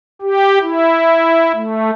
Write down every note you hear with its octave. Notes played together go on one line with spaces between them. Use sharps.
G4
E4
A3